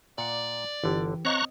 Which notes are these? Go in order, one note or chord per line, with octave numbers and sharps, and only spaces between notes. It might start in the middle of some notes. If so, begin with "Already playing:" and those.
A#2 D5 F#5
G1 D3 E3 G4
C4 C#5 D#5 F5 A#5 C#6 F#6